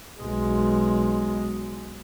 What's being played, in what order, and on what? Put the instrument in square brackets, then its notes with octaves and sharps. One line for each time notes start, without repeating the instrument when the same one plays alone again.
[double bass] B1 G#3